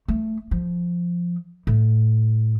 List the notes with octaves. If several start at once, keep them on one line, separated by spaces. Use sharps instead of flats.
A3
F3
A2